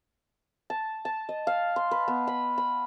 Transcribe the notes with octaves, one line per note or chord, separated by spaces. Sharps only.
A5
A5
D#5
F5
C6
B4
B3
B5
B5